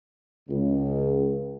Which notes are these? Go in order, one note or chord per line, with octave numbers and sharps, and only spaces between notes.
C#2